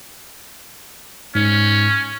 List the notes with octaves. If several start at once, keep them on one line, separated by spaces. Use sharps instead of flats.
G#2 C#4